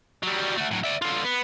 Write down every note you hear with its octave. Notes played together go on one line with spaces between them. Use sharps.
F#3 G3
A3 F#4
A2 F#3
D5 E5
D3 F4
B3